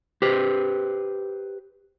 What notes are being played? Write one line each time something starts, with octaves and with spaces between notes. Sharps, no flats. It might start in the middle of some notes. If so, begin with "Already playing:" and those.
G4 B4 C5